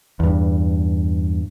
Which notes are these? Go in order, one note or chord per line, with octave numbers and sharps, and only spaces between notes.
E2 G2